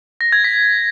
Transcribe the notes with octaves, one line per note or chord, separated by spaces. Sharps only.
A#6
G#6
B6